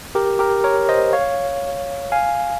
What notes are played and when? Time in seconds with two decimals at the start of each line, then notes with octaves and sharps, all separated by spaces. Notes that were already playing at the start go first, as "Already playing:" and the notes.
0.15 G4 A#4
0.39 G4 A#4
0.64 A#4 C#5
0.89 C5 D#5
1.13 C#5 F5
2.12 F5 G#5